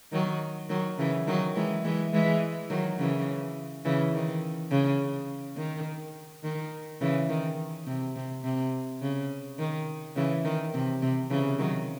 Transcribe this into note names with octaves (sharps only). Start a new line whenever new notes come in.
D#3 F#3
D#3 F#3
C#3 E3
D#3 F#3
E3 G#3
E3 G#3
E3 G#3
D#3 F#3
C#3 E3
C#3 E3
D#3
C#3
D#3
D#3
C#3 E3
D#3
C3
C3
C3
C#3
D#3
C#3 E3
D#3
C3
C3
C#3 E3
D#3 F#3